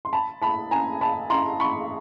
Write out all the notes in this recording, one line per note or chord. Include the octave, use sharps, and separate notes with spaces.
C6
A5 B5
A5 B5
G#5 A#5
A5 B5
A#5 C6
B5 C#6